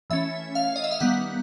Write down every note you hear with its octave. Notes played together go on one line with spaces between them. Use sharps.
E3 A3 C#4 E5
F5
D#5
E5
F5
D#3 G3 B3 F#5